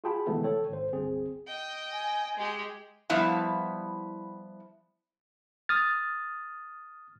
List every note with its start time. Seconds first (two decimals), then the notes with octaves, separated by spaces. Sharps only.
0.04 F4 F#4 G#4 G5 A5 B5
0.27 C3 D#3 E3 G#3 A3 B3
0.44 A4 C#5 G5
0.69 G#1 C5
0.92 G1 C2 C4 G#4
1.47 D#5 G5
1.92 G#5
2.37 G#3 G4
3.10 F3 G3 B3 E4 E5 F5
5.69 D#6 F6 A6